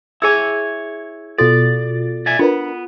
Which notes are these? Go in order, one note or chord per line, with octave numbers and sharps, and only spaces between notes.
E4 G#4 C#5 G#5 E6
B2 F4 F#4 A4 D5 A6
D5 E5 G#5
B3 D4 F4 A#4 B4